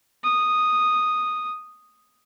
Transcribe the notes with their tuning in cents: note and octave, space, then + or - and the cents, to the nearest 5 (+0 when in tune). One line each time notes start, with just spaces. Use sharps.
D#6 -5